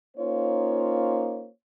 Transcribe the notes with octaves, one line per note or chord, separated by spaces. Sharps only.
A#3 C#4 D#4 F4 C5 C#5